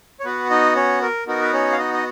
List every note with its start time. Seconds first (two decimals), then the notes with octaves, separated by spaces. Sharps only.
0.20 C#5
0.25 B3 F#4 B4
0.50 D#4 D#5
0.76 C#4 C#5
1.02 A#4
1.27 B3 D#4 F#4 A#4
1.41 B4
1.53 C#4 C#5
1.72 F5
1.79 D#4 D#5
1.94 D#5